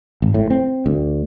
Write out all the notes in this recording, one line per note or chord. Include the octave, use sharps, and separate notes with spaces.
G#1
A2
C4
D2